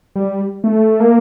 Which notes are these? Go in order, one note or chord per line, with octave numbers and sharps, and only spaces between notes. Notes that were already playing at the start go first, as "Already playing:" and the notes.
G3
A3
A#3